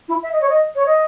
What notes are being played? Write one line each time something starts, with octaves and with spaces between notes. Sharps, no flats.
E4
E5
D#5
C#5
D#5
C#5
D#5